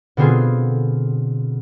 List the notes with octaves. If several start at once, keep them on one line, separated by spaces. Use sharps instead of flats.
B2 D3 B3 C4 F4 G#4